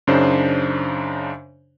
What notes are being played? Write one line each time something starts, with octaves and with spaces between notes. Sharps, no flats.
F#2 C#3 D4 D#4 C5